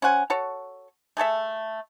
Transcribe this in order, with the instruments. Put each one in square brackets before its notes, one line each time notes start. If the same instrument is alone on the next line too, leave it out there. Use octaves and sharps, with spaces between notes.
[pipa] C#4 C5 F#5 G#5
F#4 A4 C#5
A3 G#4 A4 E5